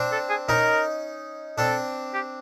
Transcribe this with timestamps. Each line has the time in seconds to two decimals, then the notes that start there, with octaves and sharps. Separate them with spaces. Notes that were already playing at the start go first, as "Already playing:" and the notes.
Already playing: C4 D4
0.12 A4
0.29 G#4
0.49 C#4 D#4 A#4
1.58 C4 D4 A4
2.14 G4